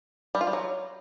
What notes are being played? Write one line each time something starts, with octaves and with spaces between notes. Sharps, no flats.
G3
F4
G3
F#3